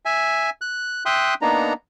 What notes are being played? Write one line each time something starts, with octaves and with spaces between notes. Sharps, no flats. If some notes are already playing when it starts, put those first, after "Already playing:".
E5 G#5
F#6
E5 G5 C6 D#6 F#6
A#3 B3 D4 D#4 A#5